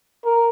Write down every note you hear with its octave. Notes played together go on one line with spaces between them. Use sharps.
A#4